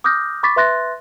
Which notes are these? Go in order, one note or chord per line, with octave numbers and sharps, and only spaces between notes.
D6 D#6 F6 G6 A#6
B5 C#6 D6 A6 B6
B4 E5 C6 F#6 A6 A#6